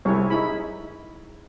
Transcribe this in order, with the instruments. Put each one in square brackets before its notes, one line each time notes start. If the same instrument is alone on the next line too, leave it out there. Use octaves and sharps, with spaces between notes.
[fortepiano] C2 [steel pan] E4 G#4 C#5
[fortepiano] G#3 [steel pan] D#4 E4 B5